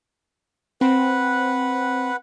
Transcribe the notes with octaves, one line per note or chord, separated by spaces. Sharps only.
C4 B4 F#5